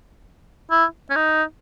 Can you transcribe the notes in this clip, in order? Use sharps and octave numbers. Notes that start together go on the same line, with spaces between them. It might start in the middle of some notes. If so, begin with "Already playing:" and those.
E4
C#4
D#4